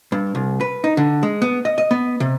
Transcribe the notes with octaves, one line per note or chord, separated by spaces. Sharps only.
G2
C2
B4
D#4
D3
G#3
B3
D#5
D#5
B3
C3